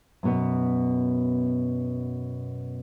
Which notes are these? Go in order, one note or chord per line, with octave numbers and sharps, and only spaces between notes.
F#2 B2 B3